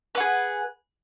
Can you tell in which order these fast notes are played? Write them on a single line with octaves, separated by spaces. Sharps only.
B4 F#5 G#4